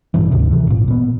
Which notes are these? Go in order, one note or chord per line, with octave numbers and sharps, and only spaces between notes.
A1 G2 B2 E3
D2 G#2 C3 D#3
C3 E3
G#1 A#2
A#2 B3